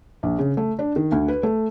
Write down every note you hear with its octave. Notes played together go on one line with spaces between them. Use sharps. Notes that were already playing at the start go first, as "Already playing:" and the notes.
A#1
C#3
A3
D4
D#3
D2
B4
A3